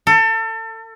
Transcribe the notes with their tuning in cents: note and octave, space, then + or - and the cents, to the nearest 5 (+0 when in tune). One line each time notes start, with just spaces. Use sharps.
A4 +30